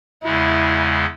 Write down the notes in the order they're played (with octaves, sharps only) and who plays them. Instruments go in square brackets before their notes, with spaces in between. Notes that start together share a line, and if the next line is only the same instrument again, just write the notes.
[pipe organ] E2 C#3 G#3 [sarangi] E4